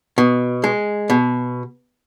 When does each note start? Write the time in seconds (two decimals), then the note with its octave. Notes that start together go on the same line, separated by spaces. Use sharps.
0.18 B2
0.64 G#3
1.10 B2